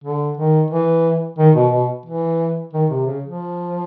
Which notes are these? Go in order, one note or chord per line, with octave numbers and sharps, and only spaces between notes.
D3
D#3
E3
D#3
B2
B2
E3
D#3
C3
C#3
F3